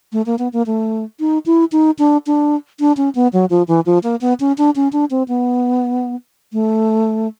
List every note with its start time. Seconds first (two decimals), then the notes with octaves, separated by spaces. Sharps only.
0.12 A3
0.26 A#3
0.39 B3
0.53 A#3
0.66 A3
1.20 D#4
1.46 E4
1.72 D#4
1.99 D4
2.27 D4
2.80 D4
2.97 C#4
3.15 B3
3.33 F#3
3.50 F3
3.68 E3
3.86 F3
4.03 A#3
4.21 B3
4.40 C#4
4.58 D4
4.76 C#4
4.93 D4
5.11 C4
5.28 B3
6.53 A3